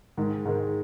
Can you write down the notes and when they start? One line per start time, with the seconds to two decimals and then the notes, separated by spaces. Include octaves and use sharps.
0.17 G#2 D#3 G#3
0.45 G#2 D#3 G#3